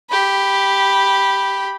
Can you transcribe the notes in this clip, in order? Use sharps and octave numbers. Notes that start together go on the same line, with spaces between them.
G4 B5